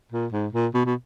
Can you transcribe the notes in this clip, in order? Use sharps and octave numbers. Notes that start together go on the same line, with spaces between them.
A#2
G#2
A#2
B2
B2